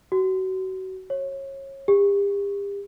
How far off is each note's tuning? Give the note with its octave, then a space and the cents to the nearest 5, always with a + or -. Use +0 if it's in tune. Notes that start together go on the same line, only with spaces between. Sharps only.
F#4 +30
C#5 -25
G4 +40